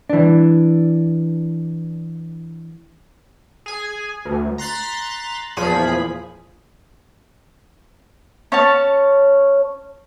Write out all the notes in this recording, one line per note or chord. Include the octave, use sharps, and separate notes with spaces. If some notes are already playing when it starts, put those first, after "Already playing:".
E3 D4
G#4 G#5
D2
A#5 C6 F#6 A6 B6
E2 A#2 F3 G#4 B5 B6
C#4 C#5 A5